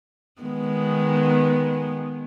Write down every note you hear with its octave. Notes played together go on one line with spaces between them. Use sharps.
D#3 G#3 B3